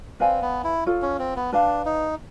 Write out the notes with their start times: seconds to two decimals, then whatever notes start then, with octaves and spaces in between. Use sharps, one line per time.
0.20 C4 B4 D5 F5 G#5
0.42 B3
0.64 E4
0.86 F4 A4 C#5
1.02 C#4
1.19 C4
1.36 B3
1.52 D4 B4 D5 F5 A5
1.85 D#4